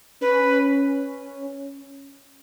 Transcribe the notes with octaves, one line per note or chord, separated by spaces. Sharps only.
C#4 B4